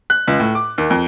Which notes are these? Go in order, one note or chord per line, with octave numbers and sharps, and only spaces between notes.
F#6
C#2
A2
D6
D#2
F2